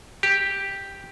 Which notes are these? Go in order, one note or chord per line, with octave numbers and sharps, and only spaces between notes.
G4